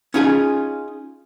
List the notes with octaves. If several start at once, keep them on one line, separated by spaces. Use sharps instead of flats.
C#4 D#4 F4 G#4 G#5